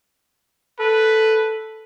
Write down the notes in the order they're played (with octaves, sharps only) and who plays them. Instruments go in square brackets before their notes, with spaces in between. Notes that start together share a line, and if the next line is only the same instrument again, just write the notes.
[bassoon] A4 [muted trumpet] B4